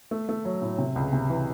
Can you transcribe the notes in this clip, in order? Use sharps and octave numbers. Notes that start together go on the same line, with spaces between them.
A3
A3
F#3
A2
C3
C#2
C3
E3